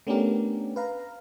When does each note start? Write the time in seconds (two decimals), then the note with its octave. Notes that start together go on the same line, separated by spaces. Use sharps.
0.07 A3 B3 C#4 D4 G4 A#4
0.76 B4 F5 A#5